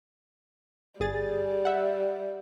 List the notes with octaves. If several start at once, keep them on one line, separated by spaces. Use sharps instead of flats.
G1 G3 G#4 A6
E5 F#5